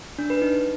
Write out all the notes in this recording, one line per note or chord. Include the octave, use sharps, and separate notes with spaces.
D4
B4
D#4